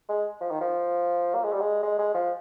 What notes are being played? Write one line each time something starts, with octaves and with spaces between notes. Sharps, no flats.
G#3
F3
D#3
F3
A#3
G#3
G3
G#3
G#3
G#3
F3